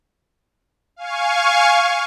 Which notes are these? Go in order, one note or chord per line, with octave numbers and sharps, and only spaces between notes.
F5 G#5 C#6